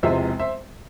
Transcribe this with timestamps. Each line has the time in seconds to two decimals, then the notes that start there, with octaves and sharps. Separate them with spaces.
0.03 E1 E2 C3 F3 G#3 C5 E5
0.39 C5 E5